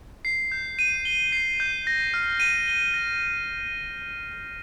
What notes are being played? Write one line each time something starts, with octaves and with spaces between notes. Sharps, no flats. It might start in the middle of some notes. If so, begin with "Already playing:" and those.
C7
G6
D#7
G7
C7
G6
A#6
F6
D#7
G7
A#6